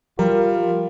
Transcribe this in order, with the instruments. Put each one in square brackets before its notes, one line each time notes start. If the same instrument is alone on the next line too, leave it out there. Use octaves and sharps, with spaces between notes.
[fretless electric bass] F3 [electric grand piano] G3 [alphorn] F4 [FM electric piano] A#4